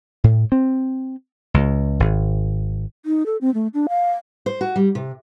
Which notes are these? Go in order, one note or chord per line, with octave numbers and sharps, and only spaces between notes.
A2
C4
C#2
G#1
D#4
A4
C4
A3
D4
F5
C5
F#4
G3
C3